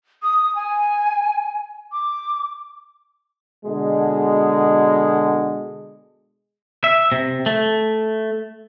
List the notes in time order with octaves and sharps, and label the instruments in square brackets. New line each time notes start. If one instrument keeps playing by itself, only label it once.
[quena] D#6
G#5
D6
[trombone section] B2 D3 G#3
[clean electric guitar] E5
C3
A3